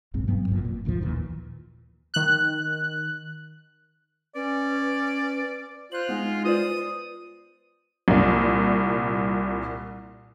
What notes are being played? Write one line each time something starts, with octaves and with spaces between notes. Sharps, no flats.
F#1 B1 G#2 C4
G2 F#3 B3
G1 F2 A#2
A#2
G#1 D2 A#2 F3
D#2 A#2 D#3 E3
D#3 F#6
C#4 B4 D5
F4 C5 F#6 F#7
G#3 B3 D#4
F4 B4 C5 D5 D#6
C2 A#2